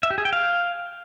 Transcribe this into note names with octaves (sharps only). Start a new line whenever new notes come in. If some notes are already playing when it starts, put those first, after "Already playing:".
E5
G4
G#4
G5
F5